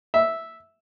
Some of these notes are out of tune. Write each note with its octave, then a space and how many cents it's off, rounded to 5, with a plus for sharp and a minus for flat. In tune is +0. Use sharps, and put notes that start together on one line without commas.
E5 -5